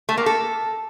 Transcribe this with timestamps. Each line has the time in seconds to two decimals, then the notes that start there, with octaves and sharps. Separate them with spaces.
0.09 A3
0.17 A#3
0.26 A4